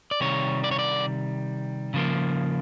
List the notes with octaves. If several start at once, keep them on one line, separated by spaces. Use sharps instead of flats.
D5
C3 D#3 G3 C#5
D5
C#5
D5
C#3 F3 A#3